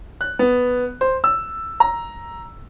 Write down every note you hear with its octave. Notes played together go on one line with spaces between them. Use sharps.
F#6
B3
C5
E6
A#5